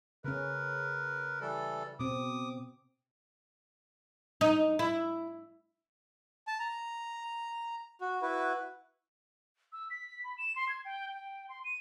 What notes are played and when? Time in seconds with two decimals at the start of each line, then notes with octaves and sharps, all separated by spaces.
0.24 C#3 C#4 A#4 B4
1.41 E3 G3 A4
2.00 B2 C4 D6 D#6
4.41 D#4
4.79 E4
6.47 A5
6.59 A#5
8.01 F#4
8.22 E4 F#4 B4
9.73 E6
9.90 B6
10.24 B5
10.38 E7
10.56 C6
10.69 G#6
10.85 G5
11.12 G5
11.49 C6
11.64 D#7